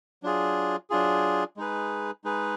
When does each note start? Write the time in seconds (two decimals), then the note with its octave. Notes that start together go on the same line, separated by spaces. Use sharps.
0.23 F#3 D4 F4 G#4
0.90 F#3 D4 F4 G#4
1.57 G#3 D#4 G#4 B4
2.24 G#3 D#4 G#4 B4